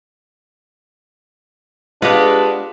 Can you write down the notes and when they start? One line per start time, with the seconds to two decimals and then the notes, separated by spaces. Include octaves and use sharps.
2.02 G#3 B3 D4 F4 G4 B4